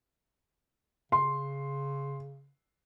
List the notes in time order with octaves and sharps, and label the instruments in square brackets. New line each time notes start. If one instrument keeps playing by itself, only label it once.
[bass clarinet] C#3 [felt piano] C6